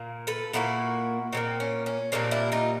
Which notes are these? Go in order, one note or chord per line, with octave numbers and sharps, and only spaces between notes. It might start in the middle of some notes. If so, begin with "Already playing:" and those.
Already playing: A#2 A#3
A4 B4
A#2 G3 A#3 E4 F#4
A#2 G3 A#3 C4
C#4
C#4
A#2 G3 A#3 C4 D4
D4 E4
D#4 F4